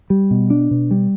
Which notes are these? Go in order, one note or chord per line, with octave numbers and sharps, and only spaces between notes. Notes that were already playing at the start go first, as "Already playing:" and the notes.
G3
B2
D4
B2
G3